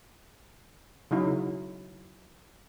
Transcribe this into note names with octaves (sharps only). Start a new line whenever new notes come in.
C#3 F#3 D#4 E4